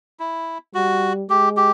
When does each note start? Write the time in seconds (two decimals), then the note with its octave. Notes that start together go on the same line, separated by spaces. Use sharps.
0.20 E4
0.74 G3 F#4
1.30 G#3 G4
1.57 G4